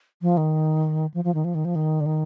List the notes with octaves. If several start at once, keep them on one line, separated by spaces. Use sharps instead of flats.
F3
D#3
F3
F3
D#3
F3
D#3
F3
D#3
D3
D#3